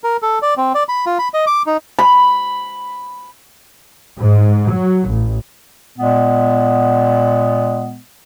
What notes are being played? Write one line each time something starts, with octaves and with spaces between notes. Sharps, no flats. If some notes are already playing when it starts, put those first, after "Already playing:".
A#4
A4
D5
C4
D5
B5
F4
B5
D#5
D6
D#4
B5
G#2
F#3
A1
A#2 G#3 B3